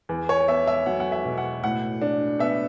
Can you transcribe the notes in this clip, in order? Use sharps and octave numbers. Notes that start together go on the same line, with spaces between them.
E2
C#5
B3 E5
E5
F#3 F#5
F#5
E5
B2
F#5
A2 F#5
D4
B3 E5